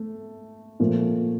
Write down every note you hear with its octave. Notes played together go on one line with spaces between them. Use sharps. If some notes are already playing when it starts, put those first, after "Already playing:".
Already playing: A3
A#2 F3 A3